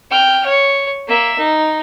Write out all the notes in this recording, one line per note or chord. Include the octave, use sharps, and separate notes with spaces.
G5 F6
C#5
A#3 E5
D#4